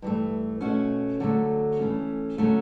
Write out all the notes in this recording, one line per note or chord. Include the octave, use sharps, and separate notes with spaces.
G2 E3 A3
B2 A3 C#4 F#4
D3 F#3 A3
E3 A3 C#4
D3 F#3 A3 C#4